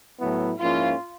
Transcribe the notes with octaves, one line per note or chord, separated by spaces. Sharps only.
A2 F#3 B3 E4
G#2 F3 A#3 C#4 E4 F4